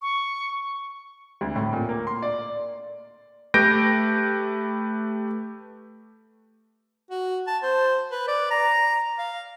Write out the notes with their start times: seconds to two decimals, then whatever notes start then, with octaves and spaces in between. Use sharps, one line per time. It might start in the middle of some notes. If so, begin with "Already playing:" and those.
0.02 C#6
1.41 D2
1.56 A2
1.73 A#2
1.89 A#3
2.07 C6
2.22 D5
3.54 A3 G4 B4 G6 A#6 D7
7.10 F#4
7.47 A5
7.63 C5
8.11 B4
8.28 D5
8.51 A#5
9.18 F5